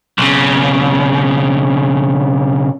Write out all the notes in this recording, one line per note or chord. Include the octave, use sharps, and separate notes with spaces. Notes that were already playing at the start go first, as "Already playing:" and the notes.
B1 C#3